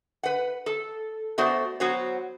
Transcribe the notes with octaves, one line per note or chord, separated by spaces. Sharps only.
B4 F#5
A4
A3 B3 F#4 C5 D5
F#3 B3 F#4 C5 C#5